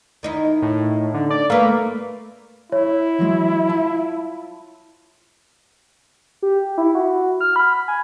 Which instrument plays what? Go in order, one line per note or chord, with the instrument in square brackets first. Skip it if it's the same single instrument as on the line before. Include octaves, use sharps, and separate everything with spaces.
[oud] D#3 D#4 E4
[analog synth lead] A2
D3
D5
[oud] A3 B4 [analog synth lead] A#3
[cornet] E4 [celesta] C#5
[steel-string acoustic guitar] E3 F#3 G#3
F4 A5
[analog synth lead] G4
E4
F#4
F6
B5
G#5